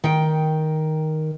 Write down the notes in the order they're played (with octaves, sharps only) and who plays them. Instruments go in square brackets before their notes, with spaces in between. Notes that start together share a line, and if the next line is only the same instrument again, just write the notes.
[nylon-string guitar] D#3 G5